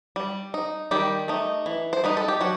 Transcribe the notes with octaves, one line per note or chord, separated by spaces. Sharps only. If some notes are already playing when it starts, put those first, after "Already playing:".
G3
D#4
D#3 G3 G4
A3 D#4
E3
C5
G3 D#4 B4
A4
G4
F#3 F#4